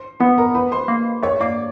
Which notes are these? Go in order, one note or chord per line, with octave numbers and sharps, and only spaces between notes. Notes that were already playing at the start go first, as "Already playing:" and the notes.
Already playing: C5 C6
B3 B4 B5
A#4 A#5
B4 B5
C5 C6
A#3
A3 C#5 C#6
A#3 D5 D6